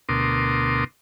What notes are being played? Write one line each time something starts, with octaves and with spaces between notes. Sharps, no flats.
D2 B2 A#4 C6 D6 D#6